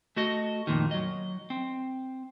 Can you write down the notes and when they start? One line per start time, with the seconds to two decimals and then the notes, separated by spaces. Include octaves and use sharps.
0.16 A3 F#4 D#5
0.67 F2 A#2 D#3
0.91 F#3 D#5
1.50 C4